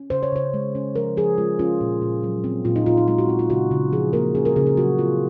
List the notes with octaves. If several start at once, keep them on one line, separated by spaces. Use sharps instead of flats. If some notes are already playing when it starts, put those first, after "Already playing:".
Already playing: C#4
C#3 C5
C#5
C#3 C5
G#3
C#4
F3 A#4
F3 G#4
G#3 F4
C#4 F4
A#2
A#2
F#3
C4
A#2 F4
D#4
A#2 F4
D#4
G#3 F4
F#4
C4 F4
F4
C#3 F#4
C#3
F3 G#4
A#3 A#4
C#4 G#4
A#4
C#3 G#4
G#4
F#3 F#4
C4 F4